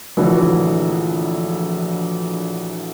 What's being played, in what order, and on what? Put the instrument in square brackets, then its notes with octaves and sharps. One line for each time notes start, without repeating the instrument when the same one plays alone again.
[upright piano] A#1 D3 E3 F#3 A3